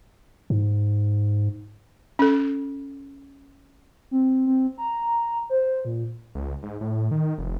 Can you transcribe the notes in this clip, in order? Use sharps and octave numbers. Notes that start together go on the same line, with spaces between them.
G#2
C#4 A4
C4
C4
A#5
C5
A#2
C#2
G#2
A2
D#3
F1